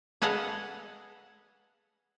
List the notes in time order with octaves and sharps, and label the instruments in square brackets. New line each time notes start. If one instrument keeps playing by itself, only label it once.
[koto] G#4 A4 B4 D#5 F5 F#5